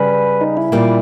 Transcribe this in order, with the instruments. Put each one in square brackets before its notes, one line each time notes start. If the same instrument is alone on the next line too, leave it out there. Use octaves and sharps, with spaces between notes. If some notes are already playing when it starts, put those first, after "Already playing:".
Already playing: [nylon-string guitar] C#3 G3 [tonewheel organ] B4
[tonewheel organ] D#4
E4
[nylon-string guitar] A#2 G3 A#3